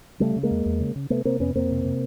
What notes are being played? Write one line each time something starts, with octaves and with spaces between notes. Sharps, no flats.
C#3 G3 A3
C#3
G#3 A#3
E2
E2
C#3
C#3
C3 A3 B3
C3 A#3 C4
F2 B3 C#4
F2 A#3 C4
C3
C3